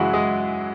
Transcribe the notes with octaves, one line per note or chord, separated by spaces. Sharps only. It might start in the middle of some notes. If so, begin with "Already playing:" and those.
Already playing: F#2 C#3 E3 F#3 G#3 E4 F#4 G#4
G#3 G#4